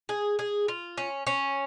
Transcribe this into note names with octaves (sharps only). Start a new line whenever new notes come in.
G#4
G#4
F4
C#4
C#4